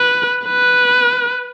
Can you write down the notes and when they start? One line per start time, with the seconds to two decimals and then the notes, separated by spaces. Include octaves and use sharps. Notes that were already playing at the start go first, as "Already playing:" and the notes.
Already playing: B4
0.45 B4